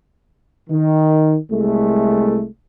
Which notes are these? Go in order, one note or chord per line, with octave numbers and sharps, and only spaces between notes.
D#3
C2 G#3 A3